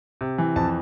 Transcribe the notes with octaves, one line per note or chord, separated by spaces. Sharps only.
C3
E3
F2 A5